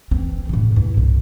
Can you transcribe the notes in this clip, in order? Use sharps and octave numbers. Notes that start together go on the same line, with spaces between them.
E3 C4
A2 C3
G2 E4
C2